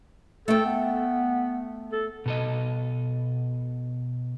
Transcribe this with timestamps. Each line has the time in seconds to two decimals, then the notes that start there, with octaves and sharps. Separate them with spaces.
0.48 A3 A4 G5
0.65 B3
1.92 A4
2.26 B2 A4 D#5